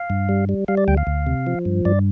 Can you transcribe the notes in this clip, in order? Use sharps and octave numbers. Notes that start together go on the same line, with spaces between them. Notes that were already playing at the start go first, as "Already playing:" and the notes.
Already playing: F5
G2
G3
G3
G3 F5
D5
D2 G5
F5
D2
C3
F3
G2
G2 D5